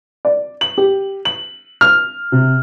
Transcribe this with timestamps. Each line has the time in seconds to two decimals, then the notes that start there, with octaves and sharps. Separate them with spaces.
0.25 D5
0.61 F#7
0.78 G4
1.25 F#7
1.81 F6
2.32 C3